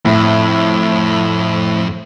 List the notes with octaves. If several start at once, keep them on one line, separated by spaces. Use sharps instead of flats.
F2 A2